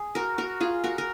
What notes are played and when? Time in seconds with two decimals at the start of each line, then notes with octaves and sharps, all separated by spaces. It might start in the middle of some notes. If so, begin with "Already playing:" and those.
Already playing: G#4
0.15 F#4 A#4
0.38 F#4 A#4
0.60 F4 G#4
0.84 F#4 A#4
0.98 A#4